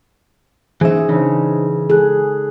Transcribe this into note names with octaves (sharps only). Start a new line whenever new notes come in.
E3 C#4 D#4 G#4 C5 E5
C#3 E3 D4 D#4 C5
G#4 A4 F#6